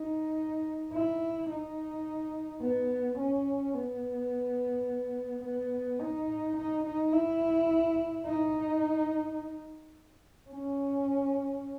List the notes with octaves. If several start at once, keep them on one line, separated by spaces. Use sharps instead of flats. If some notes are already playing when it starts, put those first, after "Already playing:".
Already playing: D#4
E4
D#4
B3
C#4
B3
B3
D#4
D#4
D#4
E4
D#4
C#4